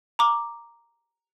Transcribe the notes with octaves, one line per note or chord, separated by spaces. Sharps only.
A#5 D6